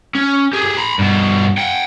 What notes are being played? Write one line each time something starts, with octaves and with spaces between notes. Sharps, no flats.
C#4
G4 G#4
A#5 B5
G2 B2
F#5 G5